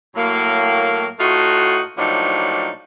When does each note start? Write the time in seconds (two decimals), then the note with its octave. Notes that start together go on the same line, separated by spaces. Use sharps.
0.16 A2 F#3 A#3
1.19 A2 A3 D#4 F4 F#4
1.98 A2 F3 F#3 A#3 D4 D#4